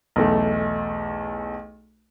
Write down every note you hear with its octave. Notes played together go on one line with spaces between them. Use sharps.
B1 E2 A3